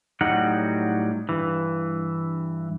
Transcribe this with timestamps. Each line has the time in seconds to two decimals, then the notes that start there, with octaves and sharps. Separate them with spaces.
0.21 A2 F#3 G3 D#4 F#5
1.29 G2 E3